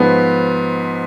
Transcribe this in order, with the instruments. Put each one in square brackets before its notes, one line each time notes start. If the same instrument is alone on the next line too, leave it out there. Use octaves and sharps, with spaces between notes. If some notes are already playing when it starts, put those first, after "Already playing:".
Already playing: [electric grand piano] G#2 F3 B3